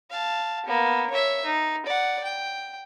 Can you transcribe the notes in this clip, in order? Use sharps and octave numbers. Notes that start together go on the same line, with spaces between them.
F5 A5
A#3 B3
C#5 E5
D#4
D5 F#5
G5